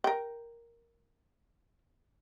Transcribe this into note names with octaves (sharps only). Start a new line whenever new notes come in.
A#4 G5